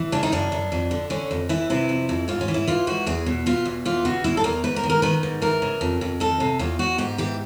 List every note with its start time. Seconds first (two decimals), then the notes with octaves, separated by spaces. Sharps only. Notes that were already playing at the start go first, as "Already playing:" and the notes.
Already playing: E3
0.12 C#3 D4
0.23 D#4
0.32 F#2 D4
0.52 F#2
0.72 F2
0.91 D3
1.10 D3 C#4
1.31 F2
1.49 E3 E4
1.70 C3 E4
1.89 F2
2.09 F2
2.28 G#2 F4
2.41 C#4
2.48 E3
2.54 E4
2.67 E3 F4
2.87 G#2 F#4
3.06 E2 G#4
3.26 B2
3.46 B2 F4
3.65 E2
3.85 E3 F4
4.05 C#3 F#4
4.24 E2 E4
4.37 A4
4.44 E2 A#4
4.64 G#2 B4
4.76 A#4
4.83 D#3
4.90 A#4
5.02 D#3 B4
5.23 G#2
5.42 E3 A#4
5.62 C#3
5.81 F2
6.01 F2
6.20 D#3 A4
6.40 C3
6.59 E2 F4
6.79 E2 F#4
6.98 G#2 G4
7.18 E3 G4